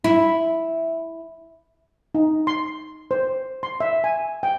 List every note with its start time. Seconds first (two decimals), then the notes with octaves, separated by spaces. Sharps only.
0.04 E4
2.15 D#4
2.47 C6
3.11 C5
3.63 C6
3.80 E5
4.04 G#5
4.43 G5